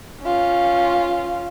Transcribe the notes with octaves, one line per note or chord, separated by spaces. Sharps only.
C#4 F4